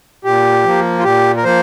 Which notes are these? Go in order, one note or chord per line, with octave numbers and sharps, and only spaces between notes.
A#2 G4
F3 A#3
F4
A#2 G4
A#4
F3 A#3 C5